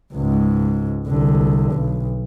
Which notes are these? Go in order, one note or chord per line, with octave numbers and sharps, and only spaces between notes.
C#2 G#2
C2 D3
B1